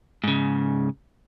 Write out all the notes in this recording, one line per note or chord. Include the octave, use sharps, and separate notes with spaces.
G#2 C#3